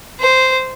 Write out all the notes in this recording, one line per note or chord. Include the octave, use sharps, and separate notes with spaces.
C5